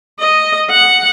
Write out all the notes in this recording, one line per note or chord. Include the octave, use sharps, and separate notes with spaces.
D#5
F#5